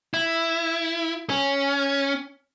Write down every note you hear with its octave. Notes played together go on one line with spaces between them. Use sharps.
E4
C#4